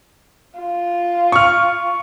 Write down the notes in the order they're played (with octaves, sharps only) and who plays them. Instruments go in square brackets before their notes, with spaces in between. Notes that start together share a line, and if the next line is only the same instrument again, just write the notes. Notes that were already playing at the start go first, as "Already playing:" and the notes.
[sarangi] F4
[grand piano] C#6 F6